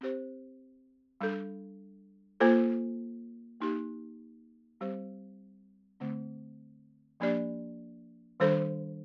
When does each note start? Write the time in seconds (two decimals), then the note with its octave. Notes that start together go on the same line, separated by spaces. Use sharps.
0.01 C4 G4 C5
1.21 G3 D4 A4
2.40 A#3 F4 A4 C5
3.61 A#3 D#4 G4
4.81 G3 C4 G4 C5
6.00 D3 A3 C4
7.20 F3 A#3 D4 G4 D5
8.40 D#3 G3 D4 A4 C5